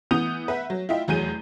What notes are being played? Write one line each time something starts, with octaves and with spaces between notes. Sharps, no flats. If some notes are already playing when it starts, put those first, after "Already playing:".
E3 B3 D#6 G6 F7
B4 E5 F#5
F#3
E4 F4 D#5 E5 G5
F1 E2 F#3 G#4 G6 D#7